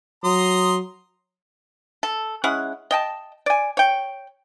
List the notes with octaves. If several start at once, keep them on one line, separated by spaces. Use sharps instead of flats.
F#3 A#5 C6 D#6
A4
G#3 C#4 E4 F#5
D#5 G5 A5
D5 G#5
C#5 G5